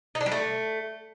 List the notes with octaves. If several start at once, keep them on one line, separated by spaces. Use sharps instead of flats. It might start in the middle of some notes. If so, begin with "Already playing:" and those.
D#4
D4
G3
A3